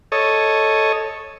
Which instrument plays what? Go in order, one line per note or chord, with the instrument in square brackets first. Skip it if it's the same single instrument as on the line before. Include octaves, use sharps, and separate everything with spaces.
[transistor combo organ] A4 C#5 D#5